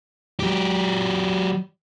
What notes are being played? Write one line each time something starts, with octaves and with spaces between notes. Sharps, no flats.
F#3 G4